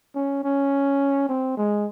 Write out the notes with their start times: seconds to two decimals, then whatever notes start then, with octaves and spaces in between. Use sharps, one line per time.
0.15 C#4
0.44 C#4
1.29 C4
1.57 G#3